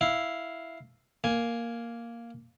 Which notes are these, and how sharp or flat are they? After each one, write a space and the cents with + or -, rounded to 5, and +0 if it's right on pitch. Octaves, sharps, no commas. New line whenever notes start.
E4 +0 F5 +0
A#3 +0 G#5 +0